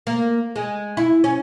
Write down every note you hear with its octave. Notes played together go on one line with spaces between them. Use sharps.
A#3
G#3
E4
C#4